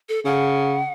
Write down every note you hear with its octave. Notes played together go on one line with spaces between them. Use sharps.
A4
C#3 F#5